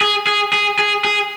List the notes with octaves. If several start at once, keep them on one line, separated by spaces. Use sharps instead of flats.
G#4
G#4
G#4
G#4
G#4